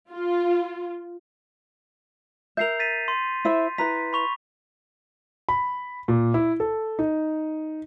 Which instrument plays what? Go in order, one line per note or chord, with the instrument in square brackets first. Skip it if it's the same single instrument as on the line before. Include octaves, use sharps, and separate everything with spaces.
[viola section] F4
[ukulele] A#4 E5 [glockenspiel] G6 C7 F7
[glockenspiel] A6 B6 D#7
C6
[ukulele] E4 C5 E5
[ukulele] E4 B4 A#5 [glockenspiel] B6
[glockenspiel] B5 C#6 F7
[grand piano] B5
A#2
E4
A4
D#4